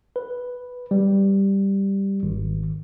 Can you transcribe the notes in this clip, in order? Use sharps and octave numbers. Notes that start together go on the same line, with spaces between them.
B4
G3
G#1